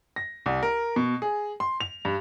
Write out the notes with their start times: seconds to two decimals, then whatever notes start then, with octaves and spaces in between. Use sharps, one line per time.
0.16 A#6
0.46 C2
0.63 A#4
0.96 B2
1.22 G#4
1.60 C6
1.81 F7
2.05 G2